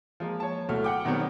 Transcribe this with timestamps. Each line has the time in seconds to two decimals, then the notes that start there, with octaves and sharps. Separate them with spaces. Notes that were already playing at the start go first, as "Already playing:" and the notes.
0.20 F3 G#3 A#3
0.40 C#5 A5
0.68 D1 B2 A3 F6
0.84 F#5 G5 D6
1.05 B2 D#3 F#3 G3 B3 C4